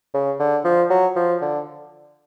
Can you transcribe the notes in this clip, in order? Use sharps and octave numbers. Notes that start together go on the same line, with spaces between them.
C#3
D3
F3
F#3
F3
D3